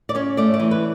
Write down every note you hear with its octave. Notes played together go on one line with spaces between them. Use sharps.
D5
C#4 C#5
A3 D5
D5
E3
B4